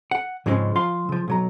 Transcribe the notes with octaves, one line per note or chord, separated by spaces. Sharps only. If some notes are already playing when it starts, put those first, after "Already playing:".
F#5
G#2 C#3 F3 G#3 C4 C#4
F3 F4 F5 C6
C#3 F3
B1 F#3 A#5